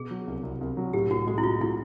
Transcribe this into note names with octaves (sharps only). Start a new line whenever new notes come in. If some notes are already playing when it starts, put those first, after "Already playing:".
Already playing: B2 G#4
F#3
C2
C2
C2
F#3
A2 G4
A2 F#4
G#3 F#4
E4
A2 F4
A2 E4